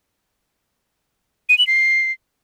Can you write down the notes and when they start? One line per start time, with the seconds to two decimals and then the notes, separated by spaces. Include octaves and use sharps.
1.49 D#7
1.58 F#7
1.67 C7